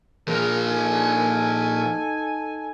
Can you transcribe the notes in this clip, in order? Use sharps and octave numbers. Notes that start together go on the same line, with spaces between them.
A#2 F3 G#4 A#4
D#4 A4 G#5